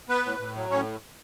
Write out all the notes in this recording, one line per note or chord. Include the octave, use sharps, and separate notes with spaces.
B3 B4
A2
A2
F#3
A2 C#4 C#5